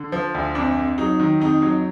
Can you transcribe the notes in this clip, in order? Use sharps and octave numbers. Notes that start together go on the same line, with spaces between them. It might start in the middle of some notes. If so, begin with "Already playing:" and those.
Already playing: D3
F3
D2
F2 D4
F2
F#3 D#4
D#3
F2 D#4
F#3